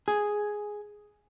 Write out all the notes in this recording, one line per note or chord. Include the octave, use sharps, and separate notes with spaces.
G#4